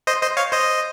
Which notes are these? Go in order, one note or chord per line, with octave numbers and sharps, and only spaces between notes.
C5 D#5
C5 D#5
C#5 F5
C5 D#5